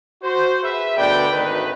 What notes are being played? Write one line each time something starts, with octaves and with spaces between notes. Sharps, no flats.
F#4 C5
G#4 B4 E5
D2 B2 D3 B4 D5 G5
G#1 D2 D#3 B4